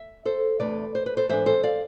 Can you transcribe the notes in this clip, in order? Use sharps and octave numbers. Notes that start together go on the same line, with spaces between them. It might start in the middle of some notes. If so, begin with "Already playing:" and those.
Already playing: E5
A4 C5
E2 C3 E3 A3 D4 B4 D5
C5
B4
A4 C5
G#2 E3 B3 D4 C5 E5
A4 C5
D5 F5